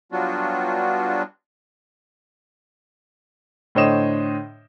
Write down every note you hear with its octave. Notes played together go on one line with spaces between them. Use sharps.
F#3 G3 B3 D4 F4 F#4
A2 D3 C5 C#5 D#5 E7